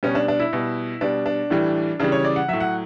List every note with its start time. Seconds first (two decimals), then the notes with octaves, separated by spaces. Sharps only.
0.03 B2 G3 C#4
0.15 D4
0.28 D4
0.40 E4
0.53 B2 G3
1.01 B2 G3 D4
1.26 D4
1.50 A2 E3 G3
1.99 C#3 E3 G3 D4
2.12 C#5
2.25 D5
2.36 F#5
2.48 A2 F#3 E5
2.60 F#5